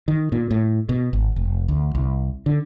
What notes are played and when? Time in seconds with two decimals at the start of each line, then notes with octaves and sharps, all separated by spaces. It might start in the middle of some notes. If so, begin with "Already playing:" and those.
0.08 D#3
0.32 A#2
0.51 A2
0.89 B2
1.13 G#1
1.36 F1
1.68 D2
1.95 C2
2.46 D3